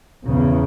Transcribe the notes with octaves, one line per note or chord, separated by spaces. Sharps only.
E2 C#3